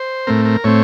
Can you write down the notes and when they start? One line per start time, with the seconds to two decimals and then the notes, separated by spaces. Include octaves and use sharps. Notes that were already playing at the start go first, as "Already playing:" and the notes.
Already playing: C5
0.27 A2 A3 C4 A#4
0.45 A#4
0.64 A2 A3 C4 C#5